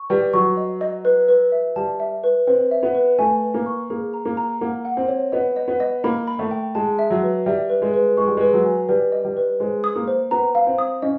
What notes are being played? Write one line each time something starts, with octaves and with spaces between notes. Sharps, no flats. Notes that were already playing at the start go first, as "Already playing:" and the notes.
Already playing: C#6
G3 B4
F#3 C#6
D#5
D#5
B4
B4
E5
G3 A5
E5
B4
C4 B4
E5
B3
B4
A3 G#5
B4
A#3
C#6
A#3 G#4
A#5
A#3
A#5
A#3 F#5
F#5
C4
C#5
B3 D#5
D#5
B3
D#5
A#3 B5
B5
A3
G5
G#3 A5
E5
F#3
B4
G3 E5
B4
G#3
B4
G#3 C#6
G3
G#3 B4
F#3
G#5
G3 B4
D#5
G3
B4
G#3 C5
D#6
A#3
C5
B3 A#5
F5
C4
D#6
C#4 D#5